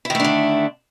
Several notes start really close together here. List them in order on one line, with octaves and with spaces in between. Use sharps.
E4 D#3 A3 D4 D3